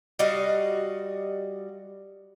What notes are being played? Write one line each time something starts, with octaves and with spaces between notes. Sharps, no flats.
G3 F#4 D#5 F5